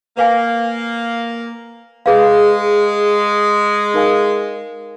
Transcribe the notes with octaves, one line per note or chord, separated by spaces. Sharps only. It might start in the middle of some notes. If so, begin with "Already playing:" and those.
A#3 B4 F5 G#5
G#3 G#4 B4 F5
D#4 A#4 F5 G#5